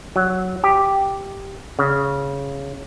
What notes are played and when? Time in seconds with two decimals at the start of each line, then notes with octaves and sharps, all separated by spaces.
0.16 F#3
0.64 G4
1.79 C#3